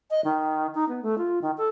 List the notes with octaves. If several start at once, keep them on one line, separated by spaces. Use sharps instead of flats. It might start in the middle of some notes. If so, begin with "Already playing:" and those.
D#5
D#3
D#4
B3
A3
F4
D#3
A4